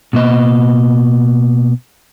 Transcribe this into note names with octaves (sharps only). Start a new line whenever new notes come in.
B2 A#3 D#5